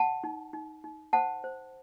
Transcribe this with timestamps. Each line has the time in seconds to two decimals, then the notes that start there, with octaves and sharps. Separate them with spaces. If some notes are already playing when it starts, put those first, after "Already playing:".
Already playing: F#5 A5
0.24 D#4
0.53 D#4
0.84 D#4
1.13 C5 F#5 A5
1.44 C5